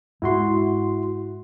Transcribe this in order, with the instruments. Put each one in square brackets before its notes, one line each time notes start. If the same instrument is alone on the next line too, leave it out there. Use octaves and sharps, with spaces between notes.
[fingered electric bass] G#2 G#3 [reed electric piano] E4 F#4 C6